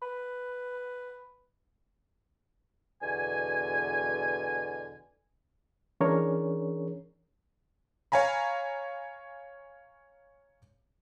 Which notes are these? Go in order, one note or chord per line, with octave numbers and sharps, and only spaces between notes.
B4
E2 B2 D3 G#5
E3 C#4 D4 G#4 A#4 C#5
C#5 F5 G#5 A#5 B5